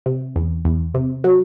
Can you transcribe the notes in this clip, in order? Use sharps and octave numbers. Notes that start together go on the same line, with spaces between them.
C3
E2
E2
C3
F#3